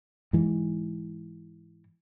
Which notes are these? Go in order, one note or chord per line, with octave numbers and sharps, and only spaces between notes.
G#2 E3